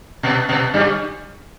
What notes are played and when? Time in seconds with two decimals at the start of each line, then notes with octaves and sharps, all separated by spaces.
0.23 B2 B3
0.49 B2 B3
0.73 G2 G3